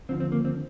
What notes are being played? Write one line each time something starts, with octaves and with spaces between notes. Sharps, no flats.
D#2 D3 F3 C4
C4
A#3
C4